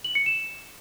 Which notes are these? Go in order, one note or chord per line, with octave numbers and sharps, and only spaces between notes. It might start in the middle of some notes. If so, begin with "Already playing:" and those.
F#7
C#7
E7